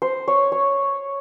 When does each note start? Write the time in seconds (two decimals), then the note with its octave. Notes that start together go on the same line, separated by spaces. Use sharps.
0.02 C5
0.28 C#5
0.52 C#5